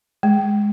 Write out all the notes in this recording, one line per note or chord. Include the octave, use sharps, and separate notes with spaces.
G#3